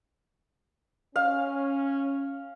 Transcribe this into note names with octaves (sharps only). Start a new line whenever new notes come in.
C#4 F5